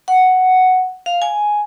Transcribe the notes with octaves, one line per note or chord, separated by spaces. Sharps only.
F#5
F5
G#5